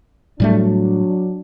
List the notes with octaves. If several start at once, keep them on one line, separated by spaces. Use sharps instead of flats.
A2 F#3 G3 A3 D4